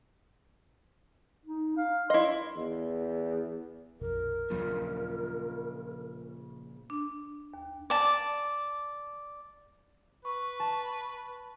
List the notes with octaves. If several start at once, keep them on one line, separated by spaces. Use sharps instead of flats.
D#4
F5
E4 D#5 C6
E2
A#1 F2 B2 A#4
D#2 A#2 C#3 F3 F#3 A#3
D4
D#2
D5 A5
B4 C#6
A5